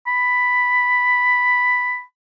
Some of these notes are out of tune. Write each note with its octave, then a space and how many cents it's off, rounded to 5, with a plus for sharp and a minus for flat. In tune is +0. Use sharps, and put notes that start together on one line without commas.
B5 +5